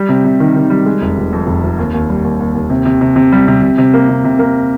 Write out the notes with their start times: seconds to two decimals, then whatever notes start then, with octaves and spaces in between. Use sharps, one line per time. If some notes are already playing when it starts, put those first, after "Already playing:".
Already playing: G3
0.09 C3
0.24 C3
0.40 D#3
0.56 D#3
0.70 G3
0.86 G#3
1.02 F1
1.17 F1
1.32 F2
1.47 F1
1.63 F1
1.79 D#2
1.94 D#2
2.09 G3
2.24 D#2
2.40 D#2
2.55 D#2
2.70 C3
2.86 C3
3.01 C3
3.16 C3
3.32 G3
3.48 C3
3.62 C3
3.78 C3
3.94 A#3
4.09 C3
4.24 C3
4.39 A#3